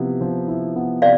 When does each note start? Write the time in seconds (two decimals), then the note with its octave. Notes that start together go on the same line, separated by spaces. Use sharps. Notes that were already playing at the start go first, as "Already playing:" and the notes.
Already playing: C3 F3 B3 E4
0.21 F3
0.48 E4
0.76 B3
1.02 C3 D5 F5